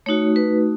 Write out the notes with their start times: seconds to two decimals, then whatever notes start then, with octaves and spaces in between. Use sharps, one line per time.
0.06 A3 D#4 F#4 C#5
0.36 B4